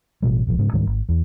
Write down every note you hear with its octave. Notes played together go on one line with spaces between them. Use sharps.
A1 B2 G3
E1 A#1 E2
G#2 C#3
C#2 G#2 D#3 G3
G#1
E2